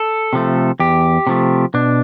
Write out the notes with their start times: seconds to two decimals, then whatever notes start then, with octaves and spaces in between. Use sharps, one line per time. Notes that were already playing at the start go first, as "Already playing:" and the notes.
Already playing: A4
0.33 C3 F3 A3
0.79 E2 G4
1.27 C3 F3 A3
1.74 B2 D4